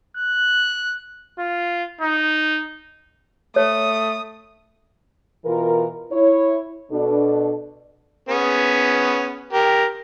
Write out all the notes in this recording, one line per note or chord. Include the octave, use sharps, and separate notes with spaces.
F#6
F4
D#4
A3 C#5 D#6
B2 E3 F4 A#4
E4 C#5
B2 D4 A4
B3 C#4 G#4
G4 A#4